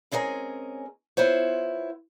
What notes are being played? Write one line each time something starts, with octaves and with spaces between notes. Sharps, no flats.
G#3 C4 C#4 G#4 A#4
B3 E4 F4 C5 C#5